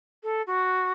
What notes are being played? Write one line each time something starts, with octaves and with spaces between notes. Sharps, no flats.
A4
F#4